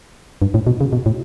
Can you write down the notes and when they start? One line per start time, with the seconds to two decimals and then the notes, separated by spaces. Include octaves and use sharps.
0.42 G2
0.54 A2
0.67 B2
0.81 C#3
0.93 B2
1.06 A2